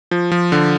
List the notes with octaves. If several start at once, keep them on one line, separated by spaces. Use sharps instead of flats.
F3
F3
D3